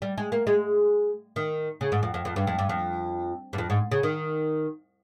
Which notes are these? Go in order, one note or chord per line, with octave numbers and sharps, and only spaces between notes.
G3
G#3
A#3
G#3
D#3
C#3
G#2
F2
F2
F2
G2
F2
G2
F2
G2
F2
G#2
C#3
D#3